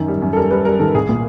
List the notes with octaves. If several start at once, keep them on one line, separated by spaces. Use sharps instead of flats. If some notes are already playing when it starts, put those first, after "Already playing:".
Already playing: F#2 D#3
G3
F#2
A4
G3 A#4
G3 B4
G3 A#4
D#3 A4
C2 G#4
A#2